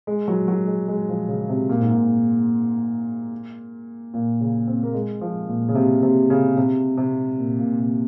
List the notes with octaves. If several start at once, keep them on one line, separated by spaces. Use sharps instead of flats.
G#3
F#3
F#3
G#3
G#3
F3
C#3
C3
A#2
G#2
A#2
A#2
C#3
C4
A#3
G#3
F3
A#2
C#3
C3
C3
C#3
C3
C3
A#2
A#2
C3